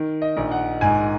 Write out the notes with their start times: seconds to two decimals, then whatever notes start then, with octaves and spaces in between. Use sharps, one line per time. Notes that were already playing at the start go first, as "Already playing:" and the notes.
Already playing: D#3
0.22 D#5
0.37 A#1
0.51 F#5
0.81 G#2 G#5